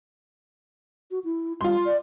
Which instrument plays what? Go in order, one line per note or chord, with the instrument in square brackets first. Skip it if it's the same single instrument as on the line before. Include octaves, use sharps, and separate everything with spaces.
[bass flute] F#4
E4
[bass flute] G3 [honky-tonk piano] F4 C6
[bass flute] D5